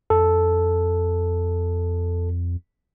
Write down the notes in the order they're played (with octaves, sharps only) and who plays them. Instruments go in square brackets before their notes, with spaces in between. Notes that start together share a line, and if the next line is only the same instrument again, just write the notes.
[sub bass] F2 [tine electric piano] A4